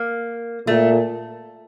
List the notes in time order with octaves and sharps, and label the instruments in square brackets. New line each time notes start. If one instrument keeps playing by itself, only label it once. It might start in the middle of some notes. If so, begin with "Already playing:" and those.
Already playing: [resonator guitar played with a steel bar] A#3
[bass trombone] A#2 [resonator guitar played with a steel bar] A3